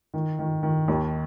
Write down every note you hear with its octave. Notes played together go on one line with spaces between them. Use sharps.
D#3
D#3
D#3
D#2